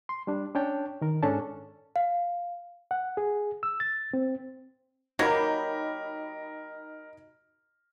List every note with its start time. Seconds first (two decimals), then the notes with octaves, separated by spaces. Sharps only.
0.09 C6
0.27 G3 D4
0.55 C#4 D4 C#5 G5 A5
1.01 D#3 A#4
1.23 G#2 C#4 D4 G#4 A4 A5
1.96 F5
2.91 F#5
3.17 G#4
3.63 E6
3.80 A6
4.13 C4
5.19 F#3 A#3 D#4 G4 A#4 B5